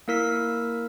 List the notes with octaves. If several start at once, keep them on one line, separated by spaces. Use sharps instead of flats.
A#3 E4 A#4 E6 B6